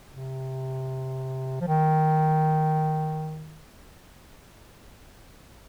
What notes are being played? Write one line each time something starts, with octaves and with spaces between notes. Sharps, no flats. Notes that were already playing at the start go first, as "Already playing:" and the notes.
C3
F3
D#3